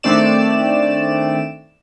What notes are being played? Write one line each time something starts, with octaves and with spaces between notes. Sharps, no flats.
D#3 A3 C4 D4 D5 E7